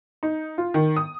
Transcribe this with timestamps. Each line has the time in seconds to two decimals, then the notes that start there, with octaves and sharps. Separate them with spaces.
0.23 D#4
0.58 F4
0.74 D#3
0.96 D#6